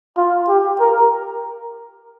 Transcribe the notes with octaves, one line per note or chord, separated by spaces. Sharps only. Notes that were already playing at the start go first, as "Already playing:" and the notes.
F4
G4
A#4